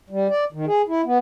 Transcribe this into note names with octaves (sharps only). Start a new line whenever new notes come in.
G3
D5
D#3
G#4
E4
B3